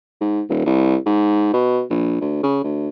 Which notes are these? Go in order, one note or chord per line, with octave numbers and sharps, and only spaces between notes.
G#2
D#1
C2
G#2
B2
A#1
D2
C#3
D2